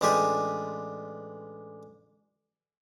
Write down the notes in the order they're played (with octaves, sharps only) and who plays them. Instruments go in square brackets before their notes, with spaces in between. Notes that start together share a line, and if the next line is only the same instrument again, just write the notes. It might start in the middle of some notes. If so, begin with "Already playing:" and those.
[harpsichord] A1 G#3 D4 F4 G4 G#5